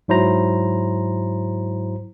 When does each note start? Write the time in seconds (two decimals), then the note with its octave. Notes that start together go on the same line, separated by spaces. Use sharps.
0.08 G#2 F#3 E4 C5 A#5